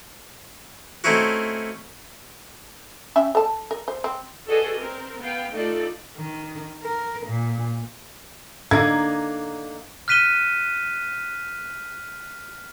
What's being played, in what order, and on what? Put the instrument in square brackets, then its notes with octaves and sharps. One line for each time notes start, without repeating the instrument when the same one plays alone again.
[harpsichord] A3 C4 C#4 D#4 E4 F#4
[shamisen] C#4 E5 G5
A4 A5
A#4
C5
C4
[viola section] F#4 G#4 A4 B4 D5 D#5
C4 A#4
B3 F5 G5
A3 D#4 F4 A4 D5
[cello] D#3
A#4
A#2
[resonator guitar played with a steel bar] D3 A#3 D#4 [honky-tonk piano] G#6
[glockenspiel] F6 F#6 B6 D#7 E7 G7